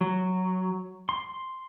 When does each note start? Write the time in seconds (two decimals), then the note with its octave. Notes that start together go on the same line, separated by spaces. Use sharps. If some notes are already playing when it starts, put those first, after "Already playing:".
0.01 F#3
1.09 C6